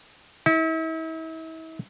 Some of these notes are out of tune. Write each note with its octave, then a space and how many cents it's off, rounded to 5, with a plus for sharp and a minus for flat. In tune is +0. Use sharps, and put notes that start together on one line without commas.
E4 -40